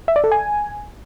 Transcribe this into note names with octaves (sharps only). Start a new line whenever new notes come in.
E5
D5
A4
G#5